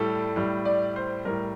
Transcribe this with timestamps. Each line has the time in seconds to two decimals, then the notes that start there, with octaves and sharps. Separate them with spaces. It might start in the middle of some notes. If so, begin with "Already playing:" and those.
Already playing: A2 G3 A4
0.36 A2 G3
0.65 D5
0.96 C5
1.25 A2 G3 A#4